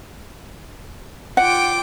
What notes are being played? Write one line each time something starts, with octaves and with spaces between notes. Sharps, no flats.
F4 F#5 G5 D6